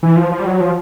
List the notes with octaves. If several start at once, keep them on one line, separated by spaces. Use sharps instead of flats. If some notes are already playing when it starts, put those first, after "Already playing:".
E3
F3
F3
G3
F#3
F3